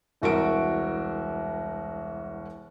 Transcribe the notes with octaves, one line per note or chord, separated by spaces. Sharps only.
E1 C2 F#4 A#4 E5 D7